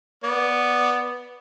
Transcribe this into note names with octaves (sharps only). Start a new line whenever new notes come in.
B3 D5